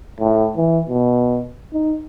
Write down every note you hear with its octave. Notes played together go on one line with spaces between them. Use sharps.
A2
E3
B2
D#4